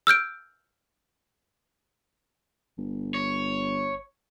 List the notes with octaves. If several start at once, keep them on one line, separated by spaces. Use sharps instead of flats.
E6 F6 G6 D7
G1
C#5